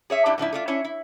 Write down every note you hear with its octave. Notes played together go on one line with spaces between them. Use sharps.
G#4 C#5 E5
G2 G3 D4 E4
G#2 F3 D4 E4
A3 D4 F4
C#4 D4 E4 C#5
E4